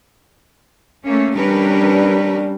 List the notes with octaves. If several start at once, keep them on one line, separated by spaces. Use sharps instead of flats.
A3 A#3 C#4
G3 C#4 D4 A#4 B4